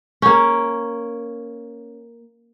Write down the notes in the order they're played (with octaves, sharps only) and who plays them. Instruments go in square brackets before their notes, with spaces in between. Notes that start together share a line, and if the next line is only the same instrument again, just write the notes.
[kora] A#3 C#4